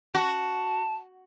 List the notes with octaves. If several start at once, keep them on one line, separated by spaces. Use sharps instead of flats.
F#4 A5